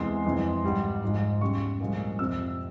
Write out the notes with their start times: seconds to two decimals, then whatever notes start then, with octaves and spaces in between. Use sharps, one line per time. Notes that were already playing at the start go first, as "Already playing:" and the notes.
Already playing: E2 C3 E3 G#3 C6
0.25 F2 E3 G#3
0.63 G#1 G#2 G3
1.03 G#1 G#2 F3 G#3
1.41 E2 C#3 G3 C#6
1.81 C2 A#2 F3 G#3
2.19 F2 C3 F3 E6